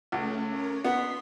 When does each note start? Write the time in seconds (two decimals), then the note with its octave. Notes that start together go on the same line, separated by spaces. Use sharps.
0.12 C#2 A3 C#4
0.49 C#4 A#4 C#5
0.85 B3 C6 B6